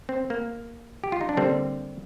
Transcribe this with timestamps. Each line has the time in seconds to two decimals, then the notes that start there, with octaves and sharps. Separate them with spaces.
0.09 C4
0.30 A#3
1.04 G4
1.12 F4
1.21 D#4
1.29 D4
1.37 D3 G3 A#3 C4